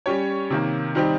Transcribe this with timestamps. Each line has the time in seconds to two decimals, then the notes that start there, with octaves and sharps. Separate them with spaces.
0.06 G3 C#4 G4 C#5
0.50 C3 D#3 A#3
0.95 D#3 G3 C4 D#4 G4